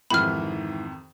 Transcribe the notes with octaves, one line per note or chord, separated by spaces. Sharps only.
F2 G#2 C3 D#3 E3 B5 F6